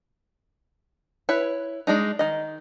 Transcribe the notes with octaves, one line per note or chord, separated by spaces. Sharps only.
E4 B4 C#5
G#3 D4 D#4
D#3 D#5